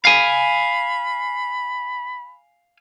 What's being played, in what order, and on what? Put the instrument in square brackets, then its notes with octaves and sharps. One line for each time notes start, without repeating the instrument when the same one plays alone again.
[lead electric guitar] F5 G#5 [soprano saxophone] B5